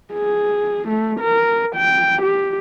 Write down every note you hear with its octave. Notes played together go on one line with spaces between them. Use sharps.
G#4
A3
A#4
G5
G4